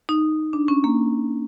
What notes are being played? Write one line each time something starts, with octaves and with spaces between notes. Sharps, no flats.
D#4
D4
C#4
A#3